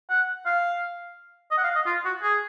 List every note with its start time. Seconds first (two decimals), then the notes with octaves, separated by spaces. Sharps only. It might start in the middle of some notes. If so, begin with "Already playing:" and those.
0.10 F#5
0.46 F5
1.51 D#5
1.58 F#5
1.64 F5
1.75 D#5
1.86 F4
2.05 F#4
2.22 G#4